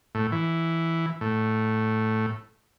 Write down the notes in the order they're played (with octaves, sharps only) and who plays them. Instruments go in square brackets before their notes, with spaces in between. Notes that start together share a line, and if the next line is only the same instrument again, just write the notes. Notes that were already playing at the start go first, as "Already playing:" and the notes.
[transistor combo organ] A2
E3
A2